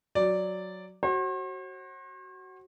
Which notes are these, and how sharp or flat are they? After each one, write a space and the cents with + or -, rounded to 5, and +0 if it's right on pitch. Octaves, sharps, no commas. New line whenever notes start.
F#3 +0 D5 -5
F#4 +20 C5 +45